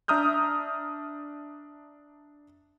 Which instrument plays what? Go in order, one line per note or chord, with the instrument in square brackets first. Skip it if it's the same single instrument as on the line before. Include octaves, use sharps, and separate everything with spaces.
[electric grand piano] D4 E5 A#5 D#6 F6 G6